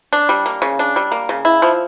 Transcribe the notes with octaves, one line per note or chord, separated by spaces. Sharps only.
D4
G3
A#3
C#3
D4
G3
A#3
C#3
E4
F3